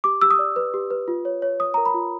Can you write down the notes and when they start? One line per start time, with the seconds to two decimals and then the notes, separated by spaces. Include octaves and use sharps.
0.04 G4 D6
0.21 G4 E6
0.31 D#6
0.39 D5
0.56 B4
0.74 G4
0.90 B4
1.08 F4
1.25 C#5
1.42 C#5
1.59 C#5 D#6
1.74 A#4 A#5
1.86 B5
1.94 F4